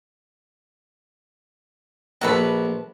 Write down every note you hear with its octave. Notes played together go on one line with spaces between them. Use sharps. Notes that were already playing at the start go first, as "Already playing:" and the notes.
A#1 F#4 A4 B4 F#5